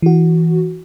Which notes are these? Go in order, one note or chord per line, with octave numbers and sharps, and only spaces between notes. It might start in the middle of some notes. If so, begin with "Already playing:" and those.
E3 F#4